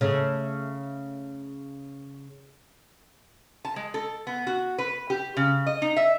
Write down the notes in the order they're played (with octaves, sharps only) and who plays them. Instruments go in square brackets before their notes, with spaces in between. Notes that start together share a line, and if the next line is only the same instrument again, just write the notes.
[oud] C#3 A3
[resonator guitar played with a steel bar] A5
G#3
A4
B3
F#4
B4
G4
C#3
D#5
D#4
E5